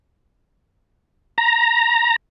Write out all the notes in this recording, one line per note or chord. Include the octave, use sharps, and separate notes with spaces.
A#5